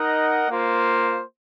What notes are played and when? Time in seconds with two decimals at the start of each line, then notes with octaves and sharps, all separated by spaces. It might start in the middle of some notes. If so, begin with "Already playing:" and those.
Already playing: D#4 A#4 D#5 F#5
0.49 A#3 F4 C5